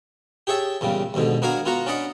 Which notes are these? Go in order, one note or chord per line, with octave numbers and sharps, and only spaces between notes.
G4 G#4 C#5 E5 A5
E2 A#2 C#3 G3
D#2 G#2 B2 D3
B3 D4 F#4 A#4 F5 G#5
B3 F4 F#4 F#5 A#5
C#4 D4 D5 D#5 F#5 B5